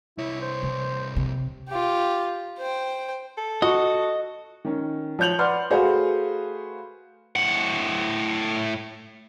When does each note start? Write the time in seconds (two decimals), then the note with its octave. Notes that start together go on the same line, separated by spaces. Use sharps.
0.18 C2 E4 C#5
0.42 C5
0.62 C3
1.16 C3
1.68 F4 G4
2.58 C5 G5
3.38 A4
3.62 F#4 D#5 C#6
4.65 D#3 C#4
5.19 F3 C#5 G6 F7 F#7
5.39 B4 D5 F#5 C6 F6
5.70 A3 F#4 G#4 B4 C5 F5
7.36 A2 F#5